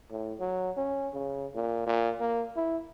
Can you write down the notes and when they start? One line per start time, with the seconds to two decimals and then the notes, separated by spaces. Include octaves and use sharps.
0.11 A2
0.40 F#3
0.77 C#4
1.14 C#3
1.55 A#2
1.87 A#2
2.20 A#3
2.56 E4